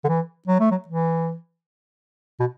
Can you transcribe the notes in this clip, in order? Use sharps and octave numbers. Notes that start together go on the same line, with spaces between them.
D3
E3
F#3
A3
F#3
E3
B2